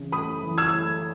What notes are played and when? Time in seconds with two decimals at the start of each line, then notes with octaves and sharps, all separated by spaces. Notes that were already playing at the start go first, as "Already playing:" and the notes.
Already playing: C#3 E3
0.12 A3 B5 D#6
0.43 E3
0.58 E6 G#6
0.74 A3